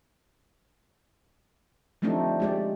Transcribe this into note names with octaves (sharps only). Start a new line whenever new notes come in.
F3 G3 A3 C4 D4 D#4
G#3 G4 D5